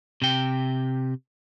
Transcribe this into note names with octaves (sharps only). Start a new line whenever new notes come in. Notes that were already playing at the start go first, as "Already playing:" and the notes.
C3 G5